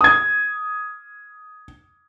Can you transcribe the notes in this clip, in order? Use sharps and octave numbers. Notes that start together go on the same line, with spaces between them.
D#6 G#6